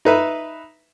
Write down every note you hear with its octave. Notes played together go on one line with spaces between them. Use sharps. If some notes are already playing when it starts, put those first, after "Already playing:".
D#4 B4 E5